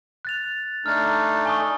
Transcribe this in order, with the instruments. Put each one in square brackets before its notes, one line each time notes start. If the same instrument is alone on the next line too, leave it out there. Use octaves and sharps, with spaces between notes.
[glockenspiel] F#6 A6 F7
[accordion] A3 D4 D#4 [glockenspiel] F6 A6
[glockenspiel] G#5 C#6 D#6